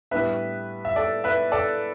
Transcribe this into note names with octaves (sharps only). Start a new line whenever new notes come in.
A2 G3 B3 D4 B4 E5
E5
A4 D5
B4 E5
A4 D5